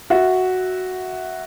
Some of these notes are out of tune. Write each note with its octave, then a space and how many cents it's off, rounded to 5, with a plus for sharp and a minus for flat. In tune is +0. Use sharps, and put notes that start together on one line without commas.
F#4 +0 E5 -10